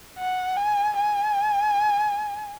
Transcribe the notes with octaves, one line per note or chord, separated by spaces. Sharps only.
F#5
G#5
G#5